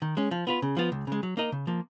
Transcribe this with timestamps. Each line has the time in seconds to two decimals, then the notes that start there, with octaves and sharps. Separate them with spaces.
0.02 D#3
0.17 G#3 C#4
0.31 F3
0.47 B3 F4 B4
0.62 C#3
0.77 F3 B3 F4
0.92 C#2
1.07 C#3 G#3
1.23 F#3
1.37 A#3 D#4 A#4 D#5
1.52 C#3
1.67 F3 A#3